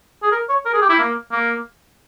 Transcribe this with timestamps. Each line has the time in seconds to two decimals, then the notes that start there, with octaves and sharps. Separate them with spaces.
0.23 G#4
0.32 A#4
0.49 C#5
0.65 A#4
0.73 G#4
0.81 G4
0.89 E4
0.99 A#3
1.32 A#3